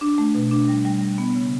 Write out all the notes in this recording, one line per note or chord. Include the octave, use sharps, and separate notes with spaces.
D4
A3
B2
D4
G3
G3
G3
B3
C#3